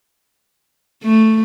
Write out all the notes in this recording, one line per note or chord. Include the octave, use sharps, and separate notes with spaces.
A3